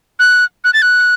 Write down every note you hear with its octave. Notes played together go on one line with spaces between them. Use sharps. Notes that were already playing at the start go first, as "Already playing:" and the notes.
F#6
F#6
A6
F#6